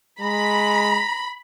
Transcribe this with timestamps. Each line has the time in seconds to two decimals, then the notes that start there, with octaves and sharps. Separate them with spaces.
0.21 G#3 A#5 B5